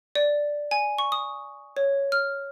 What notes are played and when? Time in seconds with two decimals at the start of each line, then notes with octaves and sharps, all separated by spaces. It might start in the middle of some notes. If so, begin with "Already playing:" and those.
0.15 D5
0.71 G#5
0.98 C#6
1.12 D#6
1.77 C#5
2.12 F6